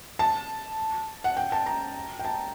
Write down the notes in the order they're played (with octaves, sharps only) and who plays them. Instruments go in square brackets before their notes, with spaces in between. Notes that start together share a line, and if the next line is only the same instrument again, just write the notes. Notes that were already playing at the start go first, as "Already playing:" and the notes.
[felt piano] A5
F#5
G5
A5
A#5
G5
A5